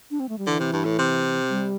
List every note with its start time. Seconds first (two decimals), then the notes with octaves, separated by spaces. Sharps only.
0.11 D4
0.20 C4
0.29 A3
0.38 G3
0.47 D3 E3
0.60 C3
0.73 G2
0.85 A2
0.99 C3
1.50 G3